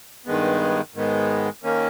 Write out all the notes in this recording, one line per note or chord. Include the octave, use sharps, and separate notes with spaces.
G2 D#3 G#3 B3
G#2 D#3 G#3 B3
D#3 A#3 C#4